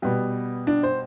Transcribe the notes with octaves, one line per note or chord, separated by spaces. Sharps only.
B2 G3 B3
D4
C5